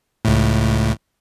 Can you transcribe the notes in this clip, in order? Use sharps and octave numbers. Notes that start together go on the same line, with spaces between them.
C#2 A2